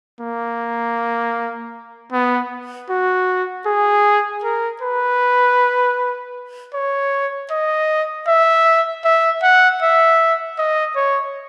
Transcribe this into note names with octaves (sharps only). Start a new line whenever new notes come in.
A#3
B3
F#4
G#4
A#4
B4
C#5
D#5
E5
E5
F#5
E5
D#5
C#5